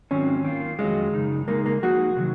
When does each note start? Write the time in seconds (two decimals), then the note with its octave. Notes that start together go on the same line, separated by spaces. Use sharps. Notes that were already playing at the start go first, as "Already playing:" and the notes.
0.11 G#2 D#3 F#3 C4 C#4 F4
0.45 D#3 A#3 F4
0.79 F2 D#3 F#3 G#3 C#4 F4
1.13 F#2 C#3 D#4
1.48 C#3 G#3 A#3 D#4 G#4
1.66 A#3
1.83 F3 A#3 D#4 F#4 G#4
2.16 C3 D#3 F#3